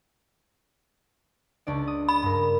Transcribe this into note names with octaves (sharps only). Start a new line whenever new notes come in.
C#2 D4 D5
D#6
B5
G2 A#4